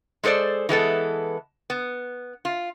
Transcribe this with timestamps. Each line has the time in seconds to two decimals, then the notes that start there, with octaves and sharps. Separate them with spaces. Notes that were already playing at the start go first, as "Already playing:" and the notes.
0.23 G#3 G#4 A4 C5 D5
0.69 E3 G#3 B3 A4
1.70 B3
2.45 F4